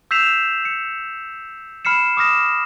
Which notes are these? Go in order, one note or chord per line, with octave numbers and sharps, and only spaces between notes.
E6 G6 B6 C7 E7 F7
C#7
B5 F6 C7 C#7 E7
D6 D#6 F6 A#6 E7